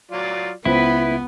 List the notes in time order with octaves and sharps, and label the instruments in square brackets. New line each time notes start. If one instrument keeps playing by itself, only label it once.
[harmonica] F#3 F4 D5
[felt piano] C#2 C5 [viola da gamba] B3 [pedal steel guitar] E4 [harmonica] B4